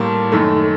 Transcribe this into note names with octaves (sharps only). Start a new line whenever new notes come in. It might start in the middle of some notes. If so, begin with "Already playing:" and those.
Already playing: A2 G3 A#3 A5 C6
F#2 D#3 A3